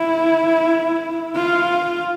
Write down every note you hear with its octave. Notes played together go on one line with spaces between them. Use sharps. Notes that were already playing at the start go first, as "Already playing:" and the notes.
Already playing: E4
F4